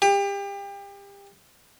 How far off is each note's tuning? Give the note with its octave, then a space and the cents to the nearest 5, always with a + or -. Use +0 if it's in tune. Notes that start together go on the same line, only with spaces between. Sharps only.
G4 +30